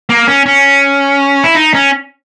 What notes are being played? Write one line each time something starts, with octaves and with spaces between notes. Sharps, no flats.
A#3
C#4
C#4
E4
D#4
C#4